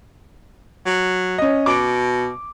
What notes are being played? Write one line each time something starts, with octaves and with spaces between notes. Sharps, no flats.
F#3
C#4 D#5
B2 D6 D7